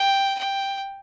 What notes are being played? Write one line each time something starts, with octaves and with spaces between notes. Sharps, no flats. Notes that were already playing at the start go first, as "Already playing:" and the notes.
Already playing: G5
G5